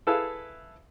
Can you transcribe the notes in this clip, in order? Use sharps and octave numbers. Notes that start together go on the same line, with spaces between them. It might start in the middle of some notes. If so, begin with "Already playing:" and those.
E4 G#4 A4 B4 F5